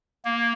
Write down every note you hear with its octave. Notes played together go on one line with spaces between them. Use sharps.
A#3